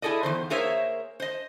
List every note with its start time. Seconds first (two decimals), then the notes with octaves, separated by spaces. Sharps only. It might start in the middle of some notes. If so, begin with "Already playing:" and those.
0.02 E4 G#4 A4 D5 D#5
0.23 E2 D#3 C5
0.50 A#3 G#4 A#4 C5 C#5 E5
1.20 C5 D#5